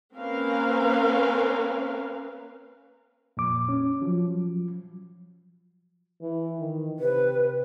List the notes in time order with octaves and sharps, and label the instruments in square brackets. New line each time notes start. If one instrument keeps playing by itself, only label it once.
[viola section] A#3 C4 C#4 A#4 B4 F5
[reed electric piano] F2 A#2 D6
C#4
F3 F#3
[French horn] E3
D#3
[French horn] C3 [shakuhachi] B4